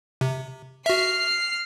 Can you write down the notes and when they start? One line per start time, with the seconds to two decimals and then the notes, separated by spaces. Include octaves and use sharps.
0.21 C3
0.86 F#4 E5 F6 C7